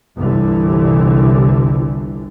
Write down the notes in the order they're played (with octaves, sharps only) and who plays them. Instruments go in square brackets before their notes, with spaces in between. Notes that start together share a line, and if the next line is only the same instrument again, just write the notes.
[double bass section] G1 C2 D3 E3